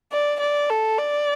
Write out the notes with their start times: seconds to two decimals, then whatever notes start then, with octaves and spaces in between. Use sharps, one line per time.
0.12 D5
0.40 D5
0.69 A4
0.98 D5